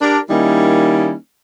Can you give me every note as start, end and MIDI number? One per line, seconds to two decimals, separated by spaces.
0.01 0.18 62
0.01 0.18 67
0.01 0.18 70
0.30 1.14 51
0.30 1.14 55
0.30 1.14 58
0.30 1.14 61
0.30 1.14 63
0.30 1.14 64